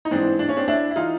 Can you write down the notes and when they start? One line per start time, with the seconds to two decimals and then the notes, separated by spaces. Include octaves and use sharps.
0.05 D#4
0.11 G#2 E3 C4 D4
0.39 D4
0.49 C#4
0.57 C4 D4
0.68 D4 E4
0.91 E4
0.96 E3 D#4 F4